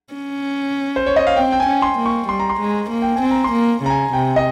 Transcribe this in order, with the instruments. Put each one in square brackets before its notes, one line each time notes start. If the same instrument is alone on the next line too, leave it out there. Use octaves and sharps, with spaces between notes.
[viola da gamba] C#4
[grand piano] C5
C#5
D#5
F5
[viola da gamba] C4 [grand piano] G5
[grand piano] G5
G#5
[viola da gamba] C#4
[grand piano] C6
[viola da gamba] A#3
[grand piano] C#6
[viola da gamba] G3 [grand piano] C6
[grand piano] A#5
C6
[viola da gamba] G#3
A#3
[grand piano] G5
G#5
[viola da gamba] C4
[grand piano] A#5
C6
[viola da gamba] A#3
[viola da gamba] C#3 [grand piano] A#5
[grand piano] G#5
[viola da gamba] C3 [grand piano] G5
[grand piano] D#5